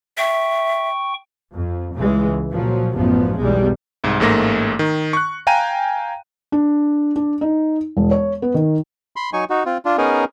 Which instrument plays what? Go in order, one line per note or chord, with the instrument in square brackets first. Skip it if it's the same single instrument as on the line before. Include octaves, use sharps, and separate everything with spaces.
[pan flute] E5 [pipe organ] G5 C#6
[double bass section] F2
C#2 C#3 E3 G#3
A#2 F3 F#3
A1 F#2 F3 B3
B1 E2 G3 G#3
[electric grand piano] C2 G#2
A1 G#2 A3 A#3 A#6
D#3
C#6 F#6
F5 G5 G#5 A#5 D#7
[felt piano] D4
D4
D#4
E1
C#5
B3
D#3
[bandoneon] B5 C6
F#3 D#4 G#5 C#6
D#4 F#4
C4 F4
D4 F4
B3 C#4 D#4 G#4 A#4